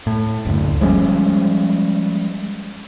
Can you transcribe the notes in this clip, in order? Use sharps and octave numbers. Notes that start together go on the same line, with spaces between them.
A2
F#1 D2
F3 G3 G#3 C#4